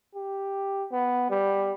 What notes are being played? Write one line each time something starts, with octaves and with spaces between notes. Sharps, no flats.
G4
B3
G3